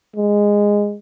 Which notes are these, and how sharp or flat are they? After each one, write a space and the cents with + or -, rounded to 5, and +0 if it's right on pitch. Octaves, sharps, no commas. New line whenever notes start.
G#3 -10